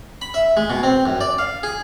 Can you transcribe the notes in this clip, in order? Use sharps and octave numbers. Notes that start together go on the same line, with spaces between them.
B5
E5
G#3
B2
C4
F#2
D5
F5
G#4